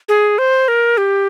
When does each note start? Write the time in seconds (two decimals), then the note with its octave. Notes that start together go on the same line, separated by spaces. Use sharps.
0.09 G#4
0.38 C5
0.68 A#4
0.97 G4